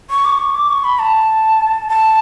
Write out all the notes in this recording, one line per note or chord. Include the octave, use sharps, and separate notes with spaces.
C#6
D6
C#6
D6
C#6
B5
A5
A5